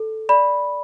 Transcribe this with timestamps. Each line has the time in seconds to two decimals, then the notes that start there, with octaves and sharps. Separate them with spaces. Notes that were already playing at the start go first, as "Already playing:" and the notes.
Already playing: A4
0.29 D5 B5